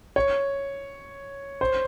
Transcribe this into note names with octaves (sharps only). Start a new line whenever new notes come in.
C#5
C5